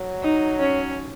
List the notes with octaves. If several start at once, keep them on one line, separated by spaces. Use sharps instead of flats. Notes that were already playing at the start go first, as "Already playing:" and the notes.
Already playing: F#3
D#4
C#4